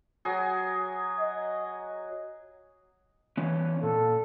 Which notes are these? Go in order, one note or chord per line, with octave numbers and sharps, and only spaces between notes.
F#3 G#4
D#5
E3 B3 C#4
A#2 A4